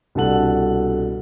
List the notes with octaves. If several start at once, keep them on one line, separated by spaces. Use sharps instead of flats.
C2 B2 D4 A4 F#5 F#7